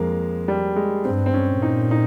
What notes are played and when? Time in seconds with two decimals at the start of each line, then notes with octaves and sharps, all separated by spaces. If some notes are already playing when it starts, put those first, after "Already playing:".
Already playing: F2 G#3 A#3
0.48 G3
0.76 G#3
1.05 G2 C4
1.26 C4
1.34 C#4
1.48 A#2
1.62 D#4
1.91 D#4